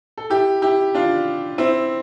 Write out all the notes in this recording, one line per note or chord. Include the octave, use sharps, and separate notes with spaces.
A4
E4 G4
E4 G4
D4 F4
C4 E4